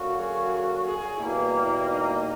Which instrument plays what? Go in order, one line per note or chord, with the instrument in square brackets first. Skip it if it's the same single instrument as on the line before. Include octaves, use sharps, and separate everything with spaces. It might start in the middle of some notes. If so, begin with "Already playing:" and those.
Already playing: [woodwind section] D3 F#3 A#3 C#4 F#4
[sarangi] G#4
G#4
[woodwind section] E2 B2 G3 A#3 [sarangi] E4
[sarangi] E4
D#4